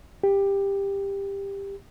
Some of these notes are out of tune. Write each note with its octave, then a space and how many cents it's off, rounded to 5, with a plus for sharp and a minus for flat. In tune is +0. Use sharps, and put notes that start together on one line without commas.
G4 +15